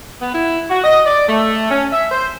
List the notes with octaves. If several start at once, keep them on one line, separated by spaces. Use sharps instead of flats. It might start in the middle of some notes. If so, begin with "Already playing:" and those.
B3
E4
F#4
D#5
D5
A3
C#4
E5
C5